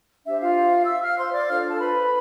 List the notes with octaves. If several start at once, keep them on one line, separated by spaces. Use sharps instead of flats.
D4 G4 C5 E5
F4 F5
E5 E6
F5 F6
C5 C6
D5 D6
D4 F4 A4 C5 F5 F6
A4 A5
B4 B5